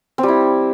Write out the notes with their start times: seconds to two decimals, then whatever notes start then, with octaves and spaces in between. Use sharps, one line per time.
0.18 C4
0.23 G3
0.28 E4